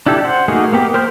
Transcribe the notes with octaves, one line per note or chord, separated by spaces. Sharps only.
D4 E4 G4 A4
C5 F#5
A3 A#3 D#4 F#4 G#4
A#3 B3 G4
A#4 C5 C6 G6